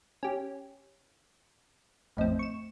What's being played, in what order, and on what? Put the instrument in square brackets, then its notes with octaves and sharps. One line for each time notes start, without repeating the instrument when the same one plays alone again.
[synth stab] C#4 G4
[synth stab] A1 F2 C4 [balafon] A3 D#5
[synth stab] C#6 E7